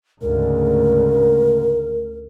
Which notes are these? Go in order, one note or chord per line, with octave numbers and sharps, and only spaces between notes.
D2 G#2 C#3 A#4